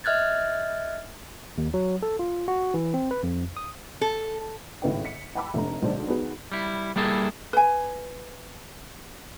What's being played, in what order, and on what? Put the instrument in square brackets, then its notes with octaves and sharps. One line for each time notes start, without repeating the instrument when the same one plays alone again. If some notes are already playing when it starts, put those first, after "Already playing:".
[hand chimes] D#5 E5 F6 F#6 G#6 A6
[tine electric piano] D#2
F#3
A4
F4
F#4
E3
C4
B4
F2
D#6
[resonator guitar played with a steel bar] A4
[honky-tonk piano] G#1 A2 C#3 B4 D#5 G5
B6 C#7
F#5 G5 A5 B5 D6 E6
F1 A3 D4 A#5
B1 D3 G#3 C5 D5 A5
B3 D#4 F#4 G#4 B4
[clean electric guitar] G3 E4
G3 A#3 E4 G#4 A4
[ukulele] B4 G#5